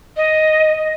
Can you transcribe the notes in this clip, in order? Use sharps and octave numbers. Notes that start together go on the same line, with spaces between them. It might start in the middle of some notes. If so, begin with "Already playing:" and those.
D#5